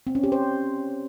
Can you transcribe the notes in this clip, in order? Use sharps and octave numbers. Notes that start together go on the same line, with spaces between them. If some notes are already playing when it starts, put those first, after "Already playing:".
C4
C#4
G4
C5